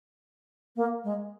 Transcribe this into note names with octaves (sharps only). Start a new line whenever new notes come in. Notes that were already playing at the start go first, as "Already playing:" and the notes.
A#3
G#3